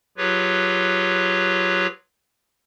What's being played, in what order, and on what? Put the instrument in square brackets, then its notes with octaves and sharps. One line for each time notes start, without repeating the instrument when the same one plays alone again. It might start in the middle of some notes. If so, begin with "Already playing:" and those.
[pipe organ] F#3 F4 G4 G#4 B4 C#5